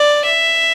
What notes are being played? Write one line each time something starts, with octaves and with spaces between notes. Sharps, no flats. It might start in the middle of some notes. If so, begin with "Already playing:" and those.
Already playing: D5
E5